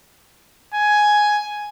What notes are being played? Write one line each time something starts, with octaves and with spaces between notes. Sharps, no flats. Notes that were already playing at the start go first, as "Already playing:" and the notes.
G#5